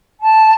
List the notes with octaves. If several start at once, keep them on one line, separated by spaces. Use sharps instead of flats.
A5